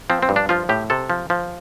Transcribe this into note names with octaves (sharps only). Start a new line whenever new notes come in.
F3 C4
C4
G2
D4
F3 F4
A2 G4
C3 A4
F3
F3